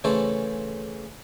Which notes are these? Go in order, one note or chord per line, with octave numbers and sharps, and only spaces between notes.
C#3 E3 A3 A4 C5 C#5